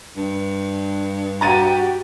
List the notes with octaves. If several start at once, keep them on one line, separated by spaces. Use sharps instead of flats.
G2
F#4 G4 A#5 A6 D#7